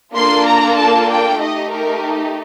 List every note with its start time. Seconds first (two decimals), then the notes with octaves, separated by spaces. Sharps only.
0.16 A#3 D4 F4 A4 C6
0.47 A#5
0.77 A5
1.09 G5
1.40 A3 D#4 G4 D#5
1.71 A#4